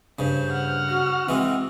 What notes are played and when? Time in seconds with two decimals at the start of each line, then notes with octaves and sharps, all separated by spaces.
0.19 G2 C#3 C5
0.51 F#5 F6
0.88 F#4
1.29 E3 G#3 C4